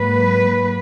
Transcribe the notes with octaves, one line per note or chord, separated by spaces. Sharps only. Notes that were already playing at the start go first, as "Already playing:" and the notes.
Already playing: G#2 F#3 A#3 B4